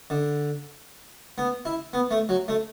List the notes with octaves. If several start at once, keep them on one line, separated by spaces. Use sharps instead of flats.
D3
B3
E4
B3
A3
F#3
A3